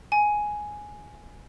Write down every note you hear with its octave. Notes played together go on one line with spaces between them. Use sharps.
G#5